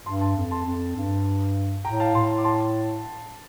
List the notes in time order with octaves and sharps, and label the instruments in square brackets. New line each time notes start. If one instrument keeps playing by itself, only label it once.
[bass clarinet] G2 [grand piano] A5 C6
[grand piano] A5 C6
[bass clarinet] F2
[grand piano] A5 C6
[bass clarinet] F2
G2
[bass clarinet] A2 [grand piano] G5 A#5
[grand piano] F5 A5
[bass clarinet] A2 [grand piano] A5 C6
[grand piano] D6
A5 C6